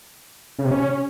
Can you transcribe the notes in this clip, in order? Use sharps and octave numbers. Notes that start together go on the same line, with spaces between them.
C#3
C3
C#4